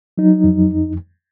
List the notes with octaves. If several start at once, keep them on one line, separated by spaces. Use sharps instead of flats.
F#3 D#4
F2